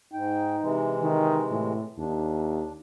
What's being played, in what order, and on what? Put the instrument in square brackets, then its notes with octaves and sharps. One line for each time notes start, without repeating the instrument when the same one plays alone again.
[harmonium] G#2 G5 [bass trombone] D#4
[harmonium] C3 E3 G#3
[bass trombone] D#3
A2
[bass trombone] D#2 [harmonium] D4